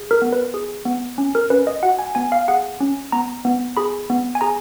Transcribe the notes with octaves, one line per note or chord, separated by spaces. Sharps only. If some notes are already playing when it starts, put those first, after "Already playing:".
Already playing: G#4
A#4
B3
B4
G#4
B3
C#4
A#4
C#4 B4
D#5
F#4 F#5
G#5
B3 G#5
F5
G#4 F#5
C#4
B3 A#5
B3
G#4 B5
B3
G#5
G#4 A#5